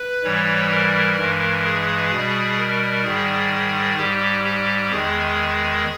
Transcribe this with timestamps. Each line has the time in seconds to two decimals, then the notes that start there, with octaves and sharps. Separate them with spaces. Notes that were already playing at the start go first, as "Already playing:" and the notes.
Already playing: B4
0.24 G#2 E3 G3 C#5
0.71 A#4
1.18 G2 E3 G#3
1.65 G#4
2.12 B2 G3
2.58 A#4
3.04 G#2 D#3 G3 G#4
3.97 G#2 G3 G4
4.44 G4
4.91 E2 D#3 G#3 G#4